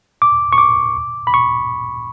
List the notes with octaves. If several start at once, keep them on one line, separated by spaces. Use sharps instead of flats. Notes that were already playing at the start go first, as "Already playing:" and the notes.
D6
C#6
D6
B5
C#6